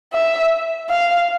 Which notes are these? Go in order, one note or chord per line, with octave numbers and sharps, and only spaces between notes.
E5
F5